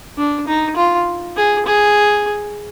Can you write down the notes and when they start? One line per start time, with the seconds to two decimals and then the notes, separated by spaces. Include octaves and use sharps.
0.18 D4
0.47 D#4
0.77 F4
1.37 G#4
1.66 G#4